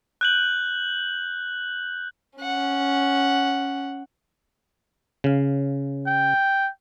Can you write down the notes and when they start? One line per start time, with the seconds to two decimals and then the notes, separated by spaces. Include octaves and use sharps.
0.21 F#6 G6 F#7
2.39 C#4 F#5
5.24 C#3 F5
6.07 G5